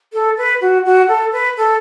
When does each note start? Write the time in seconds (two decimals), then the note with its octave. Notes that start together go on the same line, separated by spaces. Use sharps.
0.13 A4
0.37 B4
0.61 F#4
0.85 F#4
1.08 A4
1.32 B4
1.57 A4